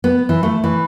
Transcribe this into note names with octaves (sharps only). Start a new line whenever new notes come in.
B3
E3
A3
E3